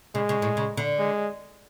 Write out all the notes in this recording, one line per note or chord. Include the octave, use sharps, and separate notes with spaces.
C#3 G#3
C#3
A2
C#3
D3
G#3